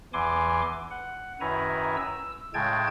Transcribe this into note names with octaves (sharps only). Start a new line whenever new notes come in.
E2 E3 G#5 C6 D6
F#5
F#2 D#3 E4 B4 G#5 A#5
E6
A2 C#3 G#3 G5 A5 G#6